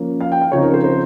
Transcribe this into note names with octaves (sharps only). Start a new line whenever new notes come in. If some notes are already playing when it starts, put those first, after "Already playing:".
Already playing: F3 A#3 C#4
F5
G5
F5
C#3 F3 C4 D#4 C#5
A#4
C5
C5